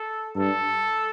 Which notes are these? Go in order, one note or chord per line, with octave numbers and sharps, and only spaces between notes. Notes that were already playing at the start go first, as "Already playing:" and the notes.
Already playing: A4
G2 A4